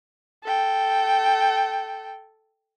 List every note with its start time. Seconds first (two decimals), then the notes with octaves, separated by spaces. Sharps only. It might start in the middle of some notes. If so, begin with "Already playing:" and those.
0.44 A4 G5